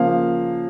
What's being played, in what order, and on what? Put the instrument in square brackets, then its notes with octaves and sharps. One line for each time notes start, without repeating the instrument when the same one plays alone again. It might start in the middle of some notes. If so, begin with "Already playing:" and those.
Already playing: [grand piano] C#3 F3 A#3 F5